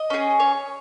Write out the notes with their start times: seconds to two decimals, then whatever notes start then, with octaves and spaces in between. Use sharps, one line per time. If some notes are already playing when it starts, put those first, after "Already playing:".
Already playing: D#5
0.10 C#4 F4 G#4
0.40 C#5